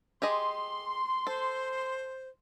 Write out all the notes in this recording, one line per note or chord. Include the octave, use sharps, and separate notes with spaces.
G4 G#4 D#5 C6
A4 C5